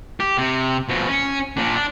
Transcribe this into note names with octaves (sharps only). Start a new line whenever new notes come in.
G4
C3
B2 F3
C#4
A#2 D4
D4